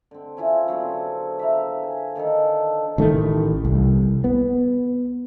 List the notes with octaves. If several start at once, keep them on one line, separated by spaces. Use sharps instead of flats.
D3 C4
C#4 E4 F4 G#4
D3 F#3 B3 C4
E5 F5 A#5
G#5
D3 D#3 D#4 A4
A1 D#3 A3
C2
B3